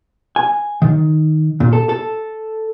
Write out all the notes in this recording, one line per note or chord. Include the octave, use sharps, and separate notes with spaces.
G#5
D#3
A#2
A4
A4